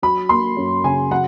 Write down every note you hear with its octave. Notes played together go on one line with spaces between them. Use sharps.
F#3 B5
A#3 C6
F#2
C#3 G#5
F#3 F#5